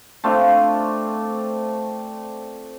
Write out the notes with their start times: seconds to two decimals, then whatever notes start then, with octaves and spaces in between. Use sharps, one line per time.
0.24 A3 C4 D4 F4